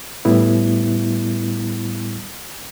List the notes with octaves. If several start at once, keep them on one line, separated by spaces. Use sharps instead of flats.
A2 G3 B3 E4